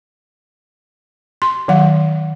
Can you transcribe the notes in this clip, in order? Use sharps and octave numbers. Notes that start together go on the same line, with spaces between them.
C6
D#3 F#3 F#5